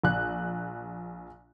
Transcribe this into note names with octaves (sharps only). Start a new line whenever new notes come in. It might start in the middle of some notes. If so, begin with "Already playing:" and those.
A#1 F#6